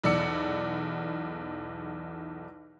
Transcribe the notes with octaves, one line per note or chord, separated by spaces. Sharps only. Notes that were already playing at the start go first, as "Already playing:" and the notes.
B1 E2 D5 E6 C#7